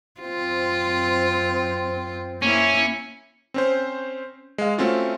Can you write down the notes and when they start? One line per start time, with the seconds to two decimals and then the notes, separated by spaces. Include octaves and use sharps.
0.21 F#2 C4 F4
2.42 A#3 C#4 E4
3.54 C4 C#4 C5
4.58 G#3 F5
4.78 A3 C4 C#4 F4 F#4